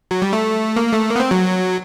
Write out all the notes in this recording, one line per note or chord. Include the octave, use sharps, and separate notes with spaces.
F#3
G3
A3
A#3
A3
A#3
B3
C4
F#3